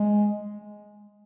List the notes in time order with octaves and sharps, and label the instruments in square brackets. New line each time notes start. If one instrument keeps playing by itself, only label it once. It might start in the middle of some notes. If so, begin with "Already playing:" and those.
Already playing: [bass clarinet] G#3